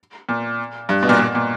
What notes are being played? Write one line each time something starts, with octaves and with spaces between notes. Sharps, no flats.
A#2
G2
B2
A#2
A#2
A#2